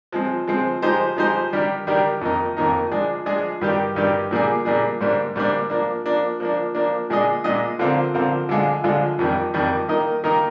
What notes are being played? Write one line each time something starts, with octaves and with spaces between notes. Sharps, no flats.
F3 G#3 C4
F3 G#3 C4
F3 G#3 D#4 G4 C5
F3 G#3 D#4 G4 C5
D#3 G3 D4 G4 A#4
D#3 G3 D4 G4 A#4
F2 D#3 A#3 D#4
F2 D#3 A#3 D#4
F3 G#3 D4 G#4
F3 G#3 D4 G#4
G2 D#3 G3 D4 G4
G2 D#3 G3 D4 G4
A#2 G3 A#3 D4 G#4
A#2 G3 A#3 D4 G#4
G#2 G3 A#3 D4
G#2 G3 A#3 D4
F3 A#3 D4
F3 A#3 D4
F3 A#3 D4
F3 A#3 D4
A#2 G#3 D4 G#4 D#5
A#2 G#3 D4 G#4 D#5
D3 F3 C4 F4 A#4
D3 F3 C4 F4 A#4
D3 F3 G#3 D4 F4
D3 F3 G#3 D4 F4
F2 D#3 G3
F2 D#3 G3
D#3 A#3 D#4 A#4 D#5
D#3 A#3 D#4 A#4 D#5